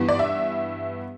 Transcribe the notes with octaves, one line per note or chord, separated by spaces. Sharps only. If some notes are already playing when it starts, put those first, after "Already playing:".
Already playing: G2 E3 B3
D5
E5